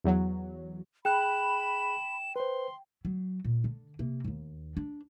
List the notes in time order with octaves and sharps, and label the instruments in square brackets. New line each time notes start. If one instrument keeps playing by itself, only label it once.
[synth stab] E2 F#3
[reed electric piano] G#4 F#6 [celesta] G5 [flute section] B5 [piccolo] E7
[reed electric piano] B4 C5 [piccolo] C6
[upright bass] F#3
A#2
D3
C3 A#3
E1 D#2
D4